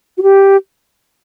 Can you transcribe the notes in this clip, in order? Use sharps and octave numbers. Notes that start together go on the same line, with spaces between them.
F#4
G4